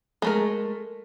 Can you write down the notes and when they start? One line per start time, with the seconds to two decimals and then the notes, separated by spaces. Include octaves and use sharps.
0.22 G#3 A3 A#4